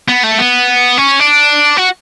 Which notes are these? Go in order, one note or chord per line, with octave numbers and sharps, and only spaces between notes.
B3
A3
B3
C#4
D4
F#4